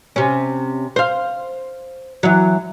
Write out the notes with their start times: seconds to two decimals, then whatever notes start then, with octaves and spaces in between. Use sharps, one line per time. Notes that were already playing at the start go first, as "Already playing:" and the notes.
0.16 C3 C#4
0.96 C5 F5
2.23 E3 F#3